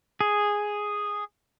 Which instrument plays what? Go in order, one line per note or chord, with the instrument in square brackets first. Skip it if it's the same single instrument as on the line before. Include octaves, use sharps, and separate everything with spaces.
[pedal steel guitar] G#4